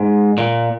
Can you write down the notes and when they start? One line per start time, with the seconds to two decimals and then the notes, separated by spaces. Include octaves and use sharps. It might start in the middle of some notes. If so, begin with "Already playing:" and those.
Already playing: G#2
0.38 A#2